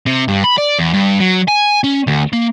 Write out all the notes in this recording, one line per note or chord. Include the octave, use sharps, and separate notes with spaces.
C3
G2
B5
D5
E2
G2
F#3
G#5
C#4
D2
A#3